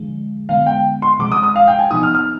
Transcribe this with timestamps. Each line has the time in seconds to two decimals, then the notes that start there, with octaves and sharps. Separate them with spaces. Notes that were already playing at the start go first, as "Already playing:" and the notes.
Already playing: D3 F3 G#3
0.49 D3 G#3 B3 F5
0.66 G5
1.02 C6
1.19 C3 F3 G#3 D6
1.32 D#6
1.43 D#6
1.56 F5
1.68 G5
1.79 G#5
1.91 C3 F3 B3 D#4 D#6
2.03 F6
2.15 F6